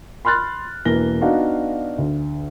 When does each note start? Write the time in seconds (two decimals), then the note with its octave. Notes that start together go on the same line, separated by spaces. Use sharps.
0.25 B5 C6 F6 F#6 A6
0.85 E1 E3 A#3 A#6 G7
1.21 B3 D4 D#4 F#4 D5 F5
1.98 D2